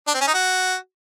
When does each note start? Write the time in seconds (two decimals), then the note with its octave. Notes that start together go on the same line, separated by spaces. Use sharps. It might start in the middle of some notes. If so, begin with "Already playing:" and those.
0.08 D4
0.14 C4
0.21 C#4
0.28 D#4
0.34 F#4